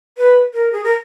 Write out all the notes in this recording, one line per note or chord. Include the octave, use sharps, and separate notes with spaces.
B4
A#4
G#4
A#4